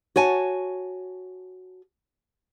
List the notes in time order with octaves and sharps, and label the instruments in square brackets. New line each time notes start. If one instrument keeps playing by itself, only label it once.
[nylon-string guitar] F#4 C#5 G#5 A5